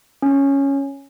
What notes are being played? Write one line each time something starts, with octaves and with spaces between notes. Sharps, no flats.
C#4